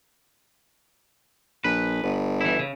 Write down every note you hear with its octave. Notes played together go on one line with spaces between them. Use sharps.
A#1 B4
G1
E3 E4
C#3